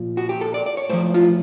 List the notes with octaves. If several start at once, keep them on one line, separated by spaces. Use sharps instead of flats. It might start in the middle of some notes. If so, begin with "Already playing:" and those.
Already playing: A#2 F3
F#4
G4
A4
D5
D5
C#5
A2 F3 C5
F4